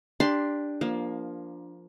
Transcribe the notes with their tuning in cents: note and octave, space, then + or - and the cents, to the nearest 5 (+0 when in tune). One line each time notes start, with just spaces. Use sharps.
D4 +0 G4 +15 C6 +0
F3 +0 A#3 +20